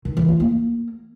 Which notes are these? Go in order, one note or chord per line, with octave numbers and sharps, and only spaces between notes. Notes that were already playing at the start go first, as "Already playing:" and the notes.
D#3
E3
F4
A#3